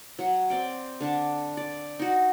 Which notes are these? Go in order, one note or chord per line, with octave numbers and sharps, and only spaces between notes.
F#3 F#5
C4 D5 G5
D3 D4 A5
D5
D#4 F#4